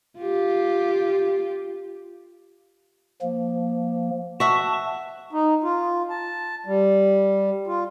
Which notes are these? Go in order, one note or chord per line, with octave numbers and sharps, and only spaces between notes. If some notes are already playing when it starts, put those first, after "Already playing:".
F4 G4
F3 A#3
F#4 E5 A5 C#6
D#4
F4
A5
G3
F4